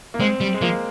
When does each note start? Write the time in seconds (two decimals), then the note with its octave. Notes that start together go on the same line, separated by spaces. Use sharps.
0.14 A#3
0.20 G#3 C4
0.41 G3
0.54 G#3
0.62 F3 A#3